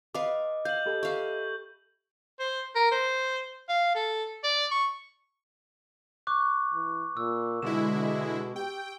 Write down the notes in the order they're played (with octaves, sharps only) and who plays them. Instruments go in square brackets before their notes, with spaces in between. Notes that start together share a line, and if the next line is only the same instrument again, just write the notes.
[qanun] B4 F5 [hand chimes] D#5 D6
[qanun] F5 [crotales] G6 F#7
[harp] G4 A4 B5
[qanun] E5 F5 [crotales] C#6
[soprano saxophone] C5
A#4
C5
F5
A4
D5
C#6
[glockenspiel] C#6 D6 F#6
[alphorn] E3
[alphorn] A#2 [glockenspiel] E6
[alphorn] B2 [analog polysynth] D3 G#3 E4 [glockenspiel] E7
[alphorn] G4 [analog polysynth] G5